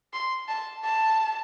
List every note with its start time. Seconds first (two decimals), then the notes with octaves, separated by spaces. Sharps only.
0.13 C6
0.48 A5
0.83 A5